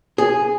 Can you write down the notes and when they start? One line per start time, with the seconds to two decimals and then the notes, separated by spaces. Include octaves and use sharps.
0.18 G#4